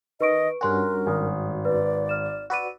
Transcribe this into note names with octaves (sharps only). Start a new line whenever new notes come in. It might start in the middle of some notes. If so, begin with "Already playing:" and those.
D#3 B4 D#5 C#6 D7
G2 C#4 F#4 A#4 G#5 C6 F#6
G#1 G#5 D#6
B4 D5
F6 E7
F#4 B4 D5 E6 D#7